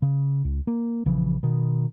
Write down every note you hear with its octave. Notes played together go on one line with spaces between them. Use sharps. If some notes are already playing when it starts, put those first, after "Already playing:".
C#3
C#2
A#3
A#1 C#3 E3 F3
B2 D#3